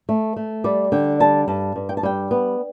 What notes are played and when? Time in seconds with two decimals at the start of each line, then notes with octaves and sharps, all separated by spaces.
0.09 A3
0.36 A3
0.64 G3 D5
0.92 D3 G5
1.20 G3 A5
1.48 G2 A5
1.76 G2
1.89 G5
1.97 A5
2.03 G3 G5
2.31 B3